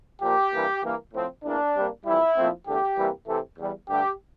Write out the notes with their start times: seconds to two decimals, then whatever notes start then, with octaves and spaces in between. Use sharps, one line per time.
0.22 A#2 F3 A#3 G4
0.53 G2 E3 A#3
0.83 G2 E3 A#3
1.13 A2 F3 C4
1.44 E2 E3 A#3 D4
1.75 C3 G3 A#3
2.05 F2 E3 G3 E4
2.37 A#2 F3 A3 C4
2.67 E2 D3 A3 G4
2.98 C3 E3 G3 A#3
3.28 C3 E3 A3
3.58 E2 E3 G3
3.89 G2 D3 A3 G4